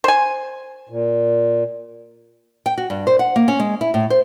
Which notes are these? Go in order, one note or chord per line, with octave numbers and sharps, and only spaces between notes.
C5 G#5
A#2
G5
F#4
G2
C5
F#5
A#3
C#4
G#3
E4
A2
C5